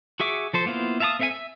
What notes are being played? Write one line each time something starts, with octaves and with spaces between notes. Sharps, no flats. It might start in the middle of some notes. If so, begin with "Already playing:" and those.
F#4 G#4 E5 C#6 D6
F3 A4 C5
A#3 B3 E4 F4 C5
E5 F5 A5 A#5 D#6
C4 A4 E5 F5 G#5
E5